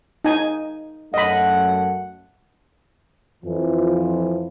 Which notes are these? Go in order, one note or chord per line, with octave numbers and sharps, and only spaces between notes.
D#4 G#5
F#2 A3 D#5 F#5 B5
F2 E3 F3